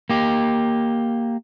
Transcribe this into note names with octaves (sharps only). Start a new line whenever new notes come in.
A#3 G4